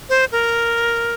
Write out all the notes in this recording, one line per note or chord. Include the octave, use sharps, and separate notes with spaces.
C5
A#4